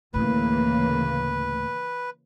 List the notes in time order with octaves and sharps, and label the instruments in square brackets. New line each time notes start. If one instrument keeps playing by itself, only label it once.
[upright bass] D2 A2 [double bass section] C#3 E3 A#3 [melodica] B4